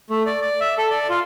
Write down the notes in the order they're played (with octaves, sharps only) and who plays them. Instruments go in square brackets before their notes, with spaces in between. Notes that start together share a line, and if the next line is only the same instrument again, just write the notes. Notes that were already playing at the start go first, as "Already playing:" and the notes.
[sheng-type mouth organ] A3
D5
D5
E5
A4
D5
F4